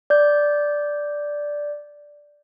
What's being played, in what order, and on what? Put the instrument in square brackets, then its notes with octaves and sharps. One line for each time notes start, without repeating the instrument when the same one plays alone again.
[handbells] D5 G6